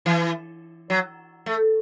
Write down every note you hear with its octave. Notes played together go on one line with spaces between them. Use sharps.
E3
F#3
A3